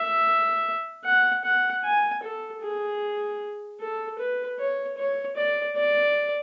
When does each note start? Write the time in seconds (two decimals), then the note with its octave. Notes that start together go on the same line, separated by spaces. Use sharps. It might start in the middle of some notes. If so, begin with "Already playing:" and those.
Already playing: E5
1.05 F#5
1.44 F#5
1.84 G#5
2.23 A4
2.62 G#4
3.80 A4
4.19 B4
4.59 C#5
4.97 C#5
5.36 D5
5.76 D5